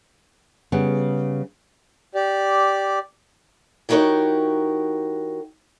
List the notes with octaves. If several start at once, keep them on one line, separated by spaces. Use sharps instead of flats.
C#3 G3 B3
G4 D5
E3 D#4 F#4 G4 A#4 C#5